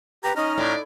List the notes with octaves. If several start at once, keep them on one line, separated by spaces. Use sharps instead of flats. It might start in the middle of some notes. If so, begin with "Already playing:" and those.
G4 B4 A#5
C#4 D#4 D#5 A#5 F6
A2 D5